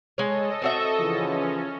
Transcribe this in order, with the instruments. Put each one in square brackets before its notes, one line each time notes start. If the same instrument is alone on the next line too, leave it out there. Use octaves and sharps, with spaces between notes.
[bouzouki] G#3 C#5 [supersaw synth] A4 D#5
[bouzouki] C4 F#4 E5
[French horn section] C#3 E3 F3 [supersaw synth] C#4